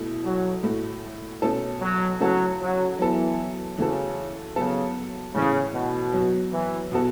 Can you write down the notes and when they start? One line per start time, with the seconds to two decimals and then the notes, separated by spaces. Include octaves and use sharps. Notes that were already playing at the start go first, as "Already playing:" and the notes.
Already playing: B2 A3 E4
0.25 F#3
0.63 A2 A3 F#4
1.42 B2 A3 C#4 A4
1.82 F#3
2.20 C#3 F#3 A3 F#4 A4
2.60 F#3
2.99 E3 F#3 B3 E4 A4
3.77 C#3 E3 A3 F#4 A4
4.56 C#3 F#3 B3 A4
5.34 A2 C#3 E3 C#4
5.73 B2
6.13 F#3 B3 F#4
6.53 E3
6.91 B2 B3 F#4 A4